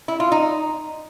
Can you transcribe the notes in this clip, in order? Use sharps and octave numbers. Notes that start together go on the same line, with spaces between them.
E4
F4
D#4